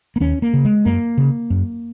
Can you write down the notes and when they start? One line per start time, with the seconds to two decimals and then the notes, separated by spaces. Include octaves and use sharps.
0.16 A#3
0.20 D#2 C#4
0.42 A#3
0.54 C#3
0.65 G#3
0.85 F#2 A#3
1.18 C#3
1.50 F#2